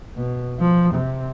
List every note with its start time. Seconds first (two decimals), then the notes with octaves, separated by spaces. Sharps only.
0.16 B2
0.59 F3
0.94 C3